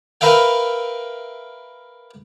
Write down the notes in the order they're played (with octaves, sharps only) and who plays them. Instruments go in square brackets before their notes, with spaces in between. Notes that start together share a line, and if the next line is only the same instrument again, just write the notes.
[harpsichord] A#4 B4 E5 F5 G5